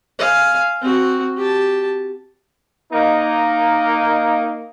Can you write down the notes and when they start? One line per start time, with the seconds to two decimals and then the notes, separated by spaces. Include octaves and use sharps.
0.19 F5 G#5
0.82 C4 F#4
1.37 G4 A5
2.92 A#3 D#4